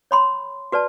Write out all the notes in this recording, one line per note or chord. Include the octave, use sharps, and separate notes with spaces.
C#5 B5 C6
F#4 B4 D5 A5